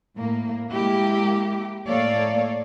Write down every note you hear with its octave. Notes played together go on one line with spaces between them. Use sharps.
A2 A#3
G#3 A#3 E4 G4
A2 A#3 A4 C#5 D5 F5